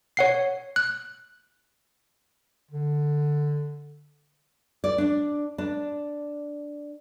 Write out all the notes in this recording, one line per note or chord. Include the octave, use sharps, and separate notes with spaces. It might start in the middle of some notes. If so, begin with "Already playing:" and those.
C#5 F#5 C7
F#6
D3
D5
D4
D4